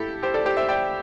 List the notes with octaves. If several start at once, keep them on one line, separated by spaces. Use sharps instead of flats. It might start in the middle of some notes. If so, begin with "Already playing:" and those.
Already playing: E4 G4 A4
G4 C5
A4 D5
G4 C5
C5 E5
D5 G5